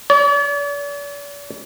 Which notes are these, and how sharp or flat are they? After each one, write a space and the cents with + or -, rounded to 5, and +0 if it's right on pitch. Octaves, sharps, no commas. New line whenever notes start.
D5 -45